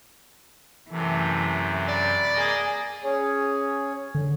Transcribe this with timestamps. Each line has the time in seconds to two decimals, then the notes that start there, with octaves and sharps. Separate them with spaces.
0.92 F#2 C3 E3 A3
1.88 D5 B5
2.34 A#3 G#4 A#4 D#5
3.04 C#4 G#4 C#5
4.15 D3